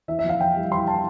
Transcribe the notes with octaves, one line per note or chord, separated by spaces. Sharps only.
E3 E5
E5
F2
F5
E3 G5
G3
E3 C6
A5